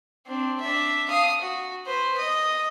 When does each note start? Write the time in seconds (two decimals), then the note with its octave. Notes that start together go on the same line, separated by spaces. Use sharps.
0.27 C4 D4
0.61 D4 E5
1.09 F5 D#6
1.41 F#4
1.86 B4 C5
2.18 D#5